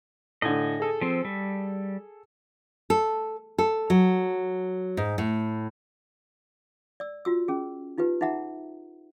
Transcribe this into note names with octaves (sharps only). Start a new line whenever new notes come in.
A2 D3 D#5 G#5
G#4 A4
F3 C4
G3
A4
A4
F#3
G#2
A2
D5 E6
F4 F#4 E6
C#4 G#4
D#4 F4 G4 B4
D#4 G#4 E5 F#5 A#5